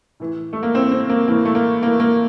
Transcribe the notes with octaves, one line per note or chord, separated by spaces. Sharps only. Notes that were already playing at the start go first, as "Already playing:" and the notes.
A2 E3
A3
A#3
A2 E3 C4
C4
A#3
A2 E3 A#3
A3
A#3
A2 E3 A#3
A#3